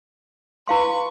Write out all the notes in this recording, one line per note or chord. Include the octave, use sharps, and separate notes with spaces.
E4 B4 F5 C6 C#6